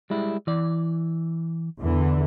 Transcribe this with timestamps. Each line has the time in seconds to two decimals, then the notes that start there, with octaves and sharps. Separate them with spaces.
0.10 G3 G#3 E4
0.47 E3 D5
1.80 E2 D3 E3